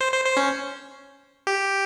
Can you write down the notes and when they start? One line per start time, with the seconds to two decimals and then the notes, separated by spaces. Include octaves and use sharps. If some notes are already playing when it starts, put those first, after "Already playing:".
0.01 C5
0.13 C5
0.25 C5
0.37 C#4
1.47 G4